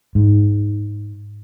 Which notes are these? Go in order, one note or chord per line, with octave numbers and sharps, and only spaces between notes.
G#2